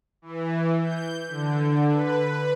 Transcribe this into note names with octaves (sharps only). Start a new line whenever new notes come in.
E3
G6
D3
B4